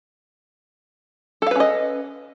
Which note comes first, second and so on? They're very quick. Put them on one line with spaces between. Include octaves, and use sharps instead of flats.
A4 F5 B4 C#4 D#5